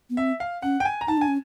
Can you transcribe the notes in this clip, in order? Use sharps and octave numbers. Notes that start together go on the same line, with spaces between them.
B3
C4 E5
F5
C#4 F#5
G5
G#5
A#5
D#4 A5
D4 G#5
C#4